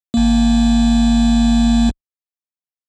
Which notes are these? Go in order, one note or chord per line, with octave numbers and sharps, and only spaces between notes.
G#1 A#3